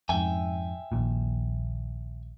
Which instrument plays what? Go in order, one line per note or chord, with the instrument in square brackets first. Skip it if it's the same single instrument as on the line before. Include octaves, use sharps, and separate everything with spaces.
[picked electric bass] F2 G#2 [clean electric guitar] E5 G5 G#5
[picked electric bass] A#1 D#2 A#2